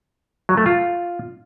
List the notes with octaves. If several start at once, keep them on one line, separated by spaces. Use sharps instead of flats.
F#3
A3
F4